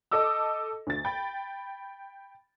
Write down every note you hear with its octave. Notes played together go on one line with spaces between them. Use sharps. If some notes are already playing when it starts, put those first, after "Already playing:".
A4 D#5 D6 E6
D2 A6
G5 B5